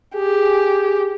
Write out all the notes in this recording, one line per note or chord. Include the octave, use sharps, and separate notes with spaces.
G4 G#4